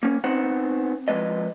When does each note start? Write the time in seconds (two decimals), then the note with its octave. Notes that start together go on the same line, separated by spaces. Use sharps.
0.03 A#3 C#4
0.24 B3 C4 D#4 C5 F#5
1.08 F2 E3 G#3 B4 D#5